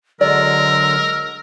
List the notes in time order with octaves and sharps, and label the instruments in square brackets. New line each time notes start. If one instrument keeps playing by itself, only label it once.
[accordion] D3 F#3 G#3 [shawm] A#4 [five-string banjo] D5 [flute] E6